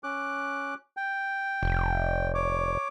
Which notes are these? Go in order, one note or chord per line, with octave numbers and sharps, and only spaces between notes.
C#4 D6 F#6
G5
F1
C#5 D6